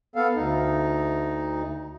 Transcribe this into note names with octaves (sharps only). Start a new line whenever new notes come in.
B3 A4 F5
D2 D#4